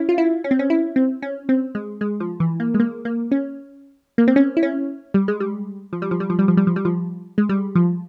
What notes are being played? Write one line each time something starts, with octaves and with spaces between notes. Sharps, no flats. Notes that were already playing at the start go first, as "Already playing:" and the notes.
Already playing: C#4 E4
F4
E4
C#4
C4
C#4
E4
C4
C#4
C4
G#3
G#3
F3
E3
A#3
G#3
A#3
A#3
C#4
A#3
C4
C#4
E4
C#4
G3
G#3
G3
F3
G3
F3
G3
F3
G3
F3
G3
F3
G3
F3
G#3
G3
F3